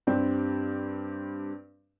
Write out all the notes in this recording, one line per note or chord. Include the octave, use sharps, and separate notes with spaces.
G2 G3 C4 G4